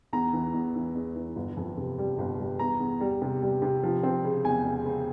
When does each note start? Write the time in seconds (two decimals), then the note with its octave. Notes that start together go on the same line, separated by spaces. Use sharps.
0.13 E2 A#5
0.33 E3
0.53 E2
0.75 E3
0.95 E2
1.16 E3
1.36 G1
1.57 F2
1.77 C3
1.98 G3
2.18 G1
2.39 G3
2.59 E2 A#5
2.80 E2
3.00 G3
3.22 C3
3.42 G3
3.62 C3
3.83 F3
4.03 C4
4.24 C#3
4.45 E2 G#5
4.65 C#3
4.85 C#3